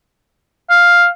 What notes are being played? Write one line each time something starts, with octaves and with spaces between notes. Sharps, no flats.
F5